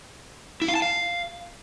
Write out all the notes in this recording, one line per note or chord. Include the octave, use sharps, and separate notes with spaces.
E4
F5
A5
F5